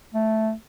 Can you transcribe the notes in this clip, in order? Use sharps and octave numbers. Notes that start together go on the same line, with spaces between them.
A3